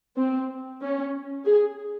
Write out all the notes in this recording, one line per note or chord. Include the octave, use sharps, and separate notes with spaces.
C4
C#4
G#4